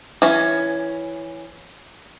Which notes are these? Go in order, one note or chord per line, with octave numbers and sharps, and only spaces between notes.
E3 C#4